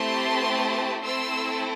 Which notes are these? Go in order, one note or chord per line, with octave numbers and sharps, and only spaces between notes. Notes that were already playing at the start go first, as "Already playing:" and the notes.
Already playing: A3 C4 E4 G4 A5 C6
A3 C4 E4 A4 C6 E6